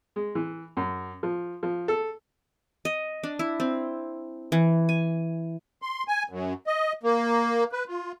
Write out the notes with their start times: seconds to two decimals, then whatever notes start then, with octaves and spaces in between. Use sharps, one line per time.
0.16 G#3
0.35 E3
0.77 F#2
1.23 F3
1.63 F3
1.88 A4
2.85 D#5
3.23 D4
3.39 E4
3.60 C4
4.52 E3
4.89 G#5
5.82 C6
6.08 G#5
6.29 F#2
6.67 D#5
7.03 A#3
7.72 B4
7.87 F4